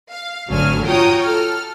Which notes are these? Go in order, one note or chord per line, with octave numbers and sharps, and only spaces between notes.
F5
G#1 D2 F#3 A4 G#5 F6
F4 F#4 C#5 G5 A#5 D#6
A4 F6